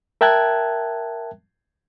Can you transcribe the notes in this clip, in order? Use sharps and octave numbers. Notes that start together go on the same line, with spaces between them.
A#4 E5 G5 A5 F#6 G#6